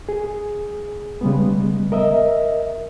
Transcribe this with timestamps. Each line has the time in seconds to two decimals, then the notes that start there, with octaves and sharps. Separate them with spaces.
0.09 G#4
1.21 C#3 G3 G#3 B3
1.92 A#4 D#5 E5